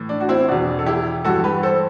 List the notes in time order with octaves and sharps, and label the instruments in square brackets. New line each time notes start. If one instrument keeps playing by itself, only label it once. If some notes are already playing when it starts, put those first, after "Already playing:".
Already playing: [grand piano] A2 E3
D4
F#4
C4 E4
E2 B2 D4 F#4
A4
E4 G4
G2 E3 F#4 A4
G4 B4
A4 C5